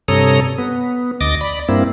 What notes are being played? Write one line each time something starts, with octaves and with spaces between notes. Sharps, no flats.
G2 C3 A4 C#5 A#5 D#6
B3
D2 D#5 D6 A6 A#6
D5 B5
G2 A#3 C4 E4